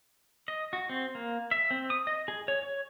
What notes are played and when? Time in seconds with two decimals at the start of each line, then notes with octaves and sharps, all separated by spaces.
0.48 D#5
0.73 F#4
0.89 C4
1.15 A#3
1.51 E5
1.71 C4
1.90 D#6
2.07 D#5
2.28 G#4
2.48 C#5
2.62 C#5